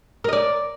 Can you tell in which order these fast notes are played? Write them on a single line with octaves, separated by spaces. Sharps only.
A#4 D#5 D5